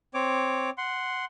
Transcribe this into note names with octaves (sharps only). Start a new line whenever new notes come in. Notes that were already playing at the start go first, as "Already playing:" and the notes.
C4 C#5 D6
F#5 C6